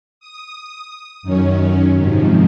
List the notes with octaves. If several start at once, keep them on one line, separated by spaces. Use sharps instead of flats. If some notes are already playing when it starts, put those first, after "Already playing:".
D#6
F#2 D#3 F#3 C#4
G#2 C3 D#3 F3